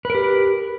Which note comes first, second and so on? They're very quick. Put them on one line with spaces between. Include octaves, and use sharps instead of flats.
B4 A#4 G4